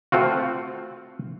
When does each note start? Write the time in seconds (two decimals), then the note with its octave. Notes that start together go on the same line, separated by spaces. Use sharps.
0.12 A3 C4 F4 F#4